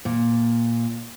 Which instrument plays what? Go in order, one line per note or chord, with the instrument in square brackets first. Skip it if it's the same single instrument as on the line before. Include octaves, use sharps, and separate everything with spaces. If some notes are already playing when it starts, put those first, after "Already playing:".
[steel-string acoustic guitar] A#2